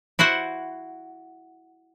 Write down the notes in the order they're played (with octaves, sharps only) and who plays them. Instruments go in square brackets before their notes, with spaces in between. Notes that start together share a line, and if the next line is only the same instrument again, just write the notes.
[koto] E4 F#4 C5 F#5